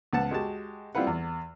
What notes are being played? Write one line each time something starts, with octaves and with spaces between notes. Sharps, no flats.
C#2 B3 F#5 A5
G#3 F#4 G4 A5
G3 C4 E4 F4 B4 F#5
E2